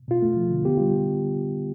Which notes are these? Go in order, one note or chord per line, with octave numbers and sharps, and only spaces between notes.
B2 F4
A3
F3
D3
B3 G4
G3 F4